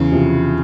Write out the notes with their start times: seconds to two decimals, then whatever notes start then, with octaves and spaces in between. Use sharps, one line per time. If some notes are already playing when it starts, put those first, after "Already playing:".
Already playing: E2 C#3
0.12 C3 F3